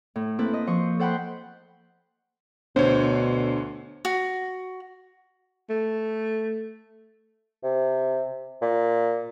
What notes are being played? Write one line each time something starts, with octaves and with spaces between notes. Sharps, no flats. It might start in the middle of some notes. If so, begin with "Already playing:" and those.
A2
A#3 C4 E4 A4 B4
D#5
F3 C5 C#6
A4 C5 F#5 G5 B5
D2 B2 D3 C5 C#5
F#4
A3
C3
A#2